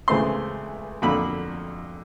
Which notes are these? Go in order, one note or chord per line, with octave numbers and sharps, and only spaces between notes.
C#2 C#3 E3 A3 C4 C6
F2 D3 F#3 A#3 B5